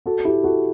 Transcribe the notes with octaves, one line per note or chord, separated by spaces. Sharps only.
F#4 A4
E4 G4
F#4 A4